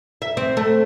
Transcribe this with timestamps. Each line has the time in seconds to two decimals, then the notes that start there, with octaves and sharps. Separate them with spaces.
0.22 E5
0.37 C4
0.57 A3